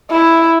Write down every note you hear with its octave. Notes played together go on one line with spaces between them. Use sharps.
E4